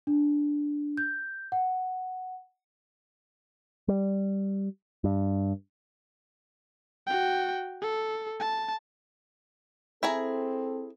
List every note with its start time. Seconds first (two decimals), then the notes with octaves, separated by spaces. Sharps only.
0.07 D4
0.97 G6
1.52 F#5
3.88 G3
5.04 G2
7.07 F#4 G5
7.82 A4
8.40 A5
10.03 C4 E4 G#4 A4 A#5